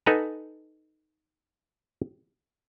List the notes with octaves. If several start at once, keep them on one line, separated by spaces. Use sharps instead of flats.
D#4 A4 B4 F#5 G#5 A#5